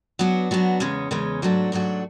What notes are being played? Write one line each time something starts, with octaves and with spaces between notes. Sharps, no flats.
F#3 B3 D4 F#4
F#3 B3 D4 F#4
E2 C#3 G#3 C#4
E2 C#3 G#3 C#4
G#2 F#3 A3 D4 F#4
G#2 F#3 A3 D4 F#4